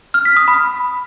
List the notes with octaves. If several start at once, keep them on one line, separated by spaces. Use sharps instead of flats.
F6
B6
D#6
B5